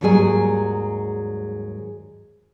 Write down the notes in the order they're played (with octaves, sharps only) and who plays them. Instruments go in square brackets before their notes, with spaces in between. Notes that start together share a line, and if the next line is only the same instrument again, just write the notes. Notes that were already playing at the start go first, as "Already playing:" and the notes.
[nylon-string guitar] D#2 G#2 F#3 G3 G#4 G#5